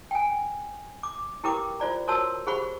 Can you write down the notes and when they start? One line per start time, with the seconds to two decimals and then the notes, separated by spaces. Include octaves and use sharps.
0.11 G5 G#5
1.03 D6
1.44 E4 G4 A#4 B4 G5 D6
1.80 F4 C5 D5 A#5
2.08 F#4 A#4 C5 C#5 A5 E6
2.47 G4 G#4 C5 F#5 B5 C#6